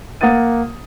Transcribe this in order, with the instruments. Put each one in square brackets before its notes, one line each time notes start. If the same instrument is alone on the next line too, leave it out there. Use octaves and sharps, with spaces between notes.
[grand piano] A#3 F#5 D#6 A6 D#7